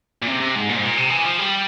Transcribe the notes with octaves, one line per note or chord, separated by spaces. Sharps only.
A#2
C3
C3
G#2
A#2
G#2
A#2
C3
E3
F3
G3